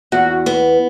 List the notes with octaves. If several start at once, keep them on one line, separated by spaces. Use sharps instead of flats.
E2 F#4
B3